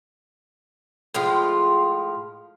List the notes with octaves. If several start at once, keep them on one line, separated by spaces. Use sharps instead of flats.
A2 F3 G#3 F4